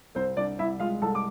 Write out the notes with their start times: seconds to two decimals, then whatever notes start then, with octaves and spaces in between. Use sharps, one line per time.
0.15 C2 C4 C5
0.37 C2 D4 D5
0.59 C2 E4 E5
0.80 G#3 F4 F5
1.01 C2 A4 A5
1.15 D6